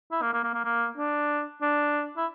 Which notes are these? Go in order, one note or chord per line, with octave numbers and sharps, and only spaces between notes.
E4
A#3
A#3
A#3
A#3
A#3
D4
D4
E4